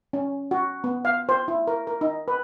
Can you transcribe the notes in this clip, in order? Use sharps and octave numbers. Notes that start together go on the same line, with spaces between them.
C#4
F#4
B3
F5
C5
E4
A#4
A#4
D#4
B4